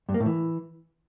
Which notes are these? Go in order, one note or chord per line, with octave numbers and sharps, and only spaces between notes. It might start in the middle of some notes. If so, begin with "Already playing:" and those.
G2
A#3
A2
E3